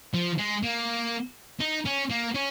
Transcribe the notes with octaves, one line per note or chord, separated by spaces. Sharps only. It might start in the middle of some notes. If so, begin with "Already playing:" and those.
F3
G#3
A#3
D#4
C#4
A#3
C#4